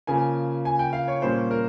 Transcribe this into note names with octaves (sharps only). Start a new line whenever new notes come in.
C#3 F3 A#3 G#5
G#5
G5
F5
C#5
A#2 G3 A#3 C#4 C5
A#4